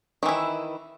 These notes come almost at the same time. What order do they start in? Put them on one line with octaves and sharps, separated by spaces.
D#3 E3 E4